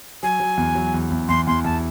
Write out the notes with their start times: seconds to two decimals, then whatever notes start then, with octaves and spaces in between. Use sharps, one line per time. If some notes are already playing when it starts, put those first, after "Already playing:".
0.23 F#3 G#5
0.40 F#3
0.57 E2
0.75 F#3
0.94 E2
1.10 E2
1.29 E2 C6
1.47 E2 C6
1.64 E2 A5